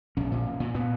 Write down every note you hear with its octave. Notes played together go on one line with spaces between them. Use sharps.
A#1 C#4
A#2
A#2
A#2
A#2 B3